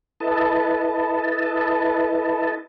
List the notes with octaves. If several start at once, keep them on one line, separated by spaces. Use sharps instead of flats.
E4 A4 B4 D#5 A5